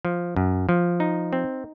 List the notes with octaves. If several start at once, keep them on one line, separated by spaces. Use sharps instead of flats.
F3
F#2
F3
D#4
C4